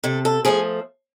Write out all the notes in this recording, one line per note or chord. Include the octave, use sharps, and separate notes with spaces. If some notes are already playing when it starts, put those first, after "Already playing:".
C3 A4
A4
F3 A3 G#4